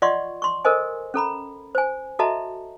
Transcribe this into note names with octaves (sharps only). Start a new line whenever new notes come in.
F4 D5 D#5 F#5 C6 C#6
C6 C#6
A4 A#4 C5 D#5 G#5
C#4 A4 A#5 B5
C5 G#5
F#4 A4 D#5 E5 A5 A#5